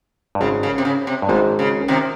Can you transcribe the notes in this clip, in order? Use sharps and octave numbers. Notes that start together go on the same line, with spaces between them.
G2
G#1 G#2 C#3
C#3
C3
C#3
C3
G2
G#1 G#2 C3
C#3
C3 D#3